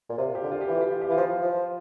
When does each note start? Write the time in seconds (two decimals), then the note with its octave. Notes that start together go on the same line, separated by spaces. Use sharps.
0.09 A#2
0.18 C3 F4
0.35 G4
0.43 D3
0.52 F4
0.61 G4
0.68 E3 F4
0.81 G4
0.92 F4
1.01 G4
1.09 E3 F4
1.17 F3
1.42 F3